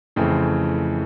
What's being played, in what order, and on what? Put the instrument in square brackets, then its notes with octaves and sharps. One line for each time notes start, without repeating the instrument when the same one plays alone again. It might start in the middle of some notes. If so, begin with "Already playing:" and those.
[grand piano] F2 C#3 E3 A3 C4